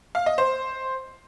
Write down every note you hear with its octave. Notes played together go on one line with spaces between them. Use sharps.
F5
D#5
C5